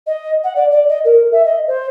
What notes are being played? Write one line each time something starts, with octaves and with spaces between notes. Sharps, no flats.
D#5
F#5
D5
D5
D#5
A#4
E5
D#5
C5